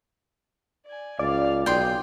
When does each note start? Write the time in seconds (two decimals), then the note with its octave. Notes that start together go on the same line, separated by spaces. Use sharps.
0.86 D5 G#5
1.19 C#2 D5 F5
1.66 B1 F4 G#4 G5 C6